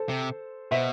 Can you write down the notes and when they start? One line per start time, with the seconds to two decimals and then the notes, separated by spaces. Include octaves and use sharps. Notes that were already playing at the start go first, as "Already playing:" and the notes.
Already playing: A4 C5
0.09 C3
0.71 B2 C5 E5